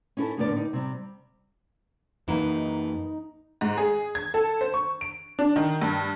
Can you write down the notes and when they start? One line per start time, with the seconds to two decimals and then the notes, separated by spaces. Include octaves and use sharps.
0.17 C#4 D#4 E4 A4
0.37 F2 A2 D3 B3 A#4 D5
0.57 D#4
0.73 C3 G3
2.28 F#2 E3 A#3 D#4
3.61 G#2
3.78 G#4
4.15 G#6
4.34 A4
4.61 C5
4.74 C#6
5.01 D7
5.39 D4
5.56 D#3
5.82 G2